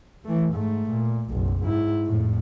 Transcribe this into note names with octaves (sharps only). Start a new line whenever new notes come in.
E3 A3
G#2 A3
A#2
F#1 B1
G#2 E4
F2 A2